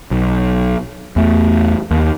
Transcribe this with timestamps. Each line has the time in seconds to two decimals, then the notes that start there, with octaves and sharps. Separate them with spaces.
0.11 B1
1.16 E2 A3
1.91 D#2